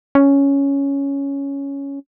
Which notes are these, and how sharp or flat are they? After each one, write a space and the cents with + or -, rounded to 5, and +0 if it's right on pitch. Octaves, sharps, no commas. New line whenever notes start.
C#4 +5